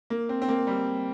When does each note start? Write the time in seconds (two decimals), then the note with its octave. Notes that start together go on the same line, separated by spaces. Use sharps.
0.10 A#3
0.29 C4
0.42 C4
0.49 A#3
0.67 G3